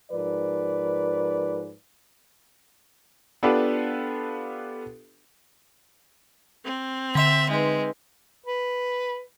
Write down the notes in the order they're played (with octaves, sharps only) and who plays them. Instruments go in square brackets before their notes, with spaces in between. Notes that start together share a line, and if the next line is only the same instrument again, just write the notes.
[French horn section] G#2 F3 A#4 B4 D5
[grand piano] B3 D4 F4 G4 A4 B4
[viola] C4
[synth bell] D3 C6 F7 [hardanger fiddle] E5
[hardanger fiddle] G#3 [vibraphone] D#4 B4
[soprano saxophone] B4